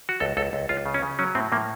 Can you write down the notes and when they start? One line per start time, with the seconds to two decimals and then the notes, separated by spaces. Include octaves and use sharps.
0.09 F#4
0.20 C#2 A4
0.37 C#2 A4
0.53 C#2
0.69 C#2 F4
0.86 C#3
0.94 C#4
1.03 C#3
1.19 F#3 C#4
1.35 A2 C4
1.52 A2 A#3